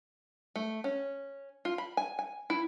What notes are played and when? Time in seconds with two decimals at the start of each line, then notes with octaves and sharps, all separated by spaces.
0.55 A3
0.84 C#4
1.65 F4
1.78 B5
1.97 G#5
2.19 G#5
2.50 E4